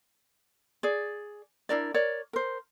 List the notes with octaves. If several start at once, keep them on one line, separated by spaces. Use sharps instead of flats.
G#4 D5
D4 E4 A#4 D5
A#4 C#5 D5
A#4 C5